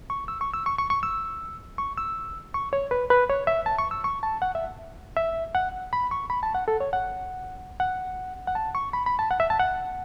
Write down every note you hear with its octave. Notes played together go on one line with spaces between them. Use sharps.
C#6
E6
C#6
E6
C#6
C#6
C#6
E6
C#6
E6
C#6
C#5
B4
B4
C#5
E5
A5
C#6
E6
C#6
A5
F#5
E5
E5
F#5
B5
C#6
B5
A5
F#5
A4
C#5
F#5
F#5
F#5
A5
C#6
B5
B5
A5
F#5
E5
A5
F#5